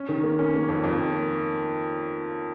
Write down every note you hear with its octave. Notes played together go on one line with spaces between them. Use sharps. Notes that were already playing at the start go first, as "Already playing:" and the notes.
Already playing: C#4
D#3
A#3
C#4
A#3
F2
F2
A#3